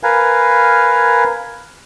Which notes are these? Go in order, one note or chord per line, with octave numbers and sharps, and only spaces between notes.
A#4 B4 F5 G#5